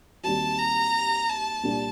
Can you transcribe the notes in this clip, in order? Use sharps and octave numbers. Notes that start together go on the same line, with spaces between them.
D#2 D#3 G3 C4 F#4 A5
A#5
A5
C2 A#2 G3 D4